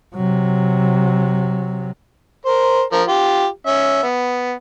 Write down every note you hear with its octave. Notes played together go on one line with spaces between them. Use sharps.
C3 F#3
A#4 C5
F3 A#4
F4 G4
C#4 E5
B3